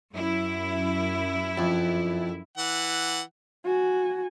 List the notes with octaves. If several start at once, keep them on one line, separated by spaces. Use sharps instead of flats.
F#2 E4
F2
E3 F#5
F#4 G#5